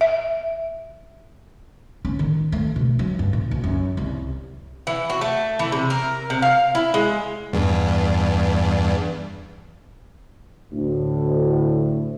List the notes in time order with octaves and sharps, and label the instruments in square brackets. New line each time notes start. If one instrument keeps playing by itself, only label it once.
[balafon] E5
[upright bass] C#4
D#3
A3
B2
F#3
G2
A#2
B1
F#2
C2
[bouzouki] E3
F#4
A3
E3
C3
A#4
C3
F5
E4
G#3
[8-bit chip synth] E2 G2
[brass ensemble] D2 A2